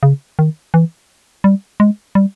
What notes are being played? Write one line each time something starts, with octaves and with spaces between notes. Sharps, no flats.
C#3
D#3
E3
G3
G#3
G3